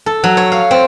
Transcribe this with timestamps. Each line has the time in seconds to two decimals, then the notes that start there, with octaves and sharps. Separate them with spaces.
0.06 A4
0.24 F#3
0.37 C#5
0.52 F5
0.71 C4